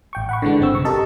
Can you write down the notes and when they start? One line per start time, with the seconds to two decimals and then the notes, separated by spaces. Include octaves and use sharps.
0.13 A1 G5 C#6
0.29 F#5 B5 C#6
0.42 D3 E3 G#3 D4
0.60 G1 C4 E6
0.72 B1 C#3 C#6
0.85 G4 A4 A#4 D#5 A5 E6